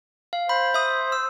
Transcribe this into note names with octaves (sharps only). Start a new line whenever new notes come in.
F5
C5 B5
E5 D#6
E6